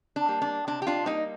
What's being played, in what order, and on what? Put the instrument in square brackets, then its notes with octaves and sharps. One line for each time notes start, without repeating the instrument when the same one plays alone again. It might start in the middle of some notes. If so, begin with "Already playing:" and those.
[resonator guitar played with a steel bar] D4
G3 A#3
D4
C3 D4
G4
D4 F4
G3 A#3 C4 D#4